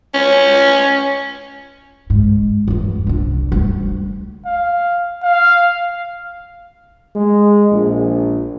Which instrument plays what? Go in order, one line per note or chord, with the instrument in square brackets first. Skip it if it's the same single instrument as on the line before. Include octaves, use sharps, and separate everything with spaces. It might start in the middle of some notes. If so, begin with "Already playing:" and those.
[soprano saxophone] C#4
[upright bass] G#2
E2 G2
C2 D4
D2 G3
[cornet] F5
F5
[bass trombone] G#3
A#1